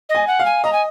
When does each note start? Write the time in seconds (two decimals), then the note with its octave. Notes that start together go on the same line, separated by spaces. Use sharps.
0.09 D#5
0.15 G#5
0.27 F#5
0.40 F5
0.45 G#5
0.64 D#5 A#5
0.72 G#5